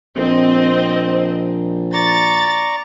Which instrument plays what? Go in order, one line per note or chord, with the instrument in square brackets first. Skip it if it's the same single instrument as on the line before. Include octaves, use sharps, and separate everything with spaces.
[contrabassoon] A#1 [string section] C4 D#5
[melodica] D5 A#5 C#6 [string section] A6